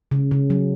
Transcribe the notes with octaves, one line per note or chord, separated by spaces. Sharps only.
C#3
C#3
F#3